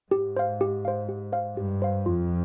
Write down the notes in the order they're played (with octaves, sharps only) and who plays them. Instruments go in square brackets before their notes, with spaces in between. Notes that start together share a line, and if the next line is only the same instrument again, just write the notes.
[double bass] G#2 [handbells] G4
[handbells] C5 F5
G4
C5 F5
G4
C5 F5
[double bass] G2 [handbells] G4
[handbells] C5 F5
[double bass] F2 [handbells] F4